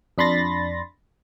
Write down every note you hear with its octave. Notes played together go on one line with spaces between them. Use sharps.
F2 D4 B5 C6 A6 A#6